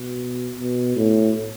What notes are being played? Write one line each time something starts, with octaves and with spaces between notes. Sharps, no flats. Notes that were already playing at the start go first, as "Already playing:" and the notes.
Already playing: B2
B2
A2